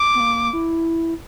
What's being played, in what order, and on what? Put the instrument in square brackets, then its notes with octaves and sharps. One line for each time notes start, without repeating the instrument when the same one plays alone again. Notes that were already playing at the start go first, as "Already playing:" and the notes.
Already playing: [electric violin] D6
[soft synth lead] B3
A#3
E4